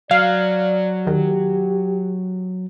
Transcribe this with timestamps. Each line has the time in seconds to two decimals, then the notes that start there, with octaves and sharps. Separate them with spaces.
0.11 F#3 D5 F5
1.07 D#2 G4